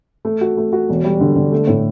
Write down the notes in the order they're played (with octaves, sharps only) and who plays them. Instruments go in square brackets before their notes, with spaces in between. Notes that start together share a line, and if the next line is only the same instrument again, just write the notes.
[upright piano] A3
F#4
A3
F#4
E1
G3
D3
D3
A3
A2